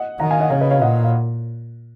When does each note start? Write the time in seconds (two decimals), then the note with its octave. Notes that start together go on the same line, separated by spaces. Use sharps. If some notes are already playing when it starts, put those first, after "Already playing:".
Already playing: D#5 F#5
0.19 D#3 F#5 A#5
0.31 F5 G#5
0.40 D#5 F#5
0.50 C#3 C#5 F5
0.60 B4 D#5
0.71 C#5 F5
0.81 A#2 D#5 F#5
1.04 F5